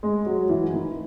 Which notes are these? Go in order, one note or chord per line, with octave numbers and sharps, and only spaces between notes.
G#3
F#3
E3
D#3